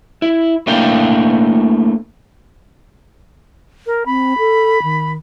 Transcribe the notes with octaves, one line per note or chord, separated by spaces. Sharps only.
E4
A3 A#3 D4 E4 F5 G5
A#4
C4 B5
A4
D#3